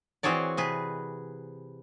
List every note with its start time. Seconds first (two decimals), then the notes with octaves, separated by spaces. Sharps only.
0.23 E3 C4 F#4 G#4 C#5 D5
0.57 C3 G#4 B4